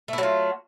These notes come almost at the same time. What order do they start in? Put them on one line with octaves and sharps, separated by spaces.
A3 E4 F#3 F4